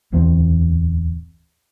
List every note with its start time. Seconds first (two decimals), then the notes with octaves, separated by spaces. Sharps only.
0.12 D1 E2 E3 C4